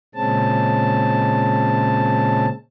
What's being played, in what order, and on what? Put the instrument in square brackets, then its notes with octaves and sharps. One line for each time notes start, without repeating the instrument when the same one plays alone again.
[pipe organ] A#2 C#3 G#3 C4 C#4 A5